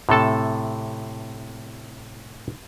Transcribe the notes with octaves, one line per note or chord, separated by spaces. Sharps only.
A2 C3 A4 A5